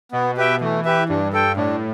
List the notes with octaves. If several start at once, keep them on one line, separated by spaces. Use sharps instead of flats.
B2 B3
G4 B4 E5 G5
E3 A3
G4 B4 E5
G2 D4
A4 G5
A2 D4